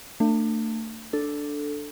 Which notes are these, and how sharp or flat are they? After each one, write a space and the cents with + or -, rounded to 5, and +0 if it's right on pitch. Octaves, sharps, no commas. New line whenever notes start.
A3 +35 D4 +25
D4 +0 A4 +0